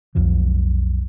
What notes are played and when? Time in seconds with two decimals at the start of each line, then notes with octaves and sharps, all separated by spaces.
0.15 B1 F2 F3 F#3